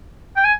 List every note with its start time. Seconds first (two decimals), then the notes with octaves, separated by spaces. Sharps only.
0.36 G5
0.44 G#5